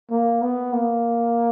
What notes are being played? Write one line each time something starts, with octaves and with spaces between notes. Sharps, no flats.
A#3
B3
A#3